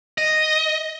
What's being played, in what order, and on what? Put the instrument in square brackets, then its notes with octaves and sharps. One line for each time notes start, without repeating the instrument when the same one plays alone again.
[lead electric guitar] D#5